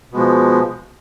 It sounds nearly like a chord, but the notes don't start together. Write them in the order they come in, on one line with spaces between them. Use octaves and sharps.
B2 G#3 F3